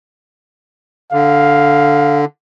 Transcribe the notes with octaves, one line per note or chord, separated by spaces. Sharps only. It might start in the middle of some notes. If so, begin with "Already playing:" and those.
D3 F5